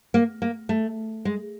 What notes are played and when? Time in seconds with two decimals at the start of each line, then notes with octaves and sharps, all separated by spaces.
0.14 A#3
0.42 A#3
0.69 A3
1.25 G#3